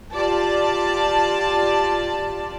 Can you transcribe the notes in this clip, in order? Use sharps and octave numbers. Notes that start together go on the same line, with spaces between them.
F4 G4 D5 A5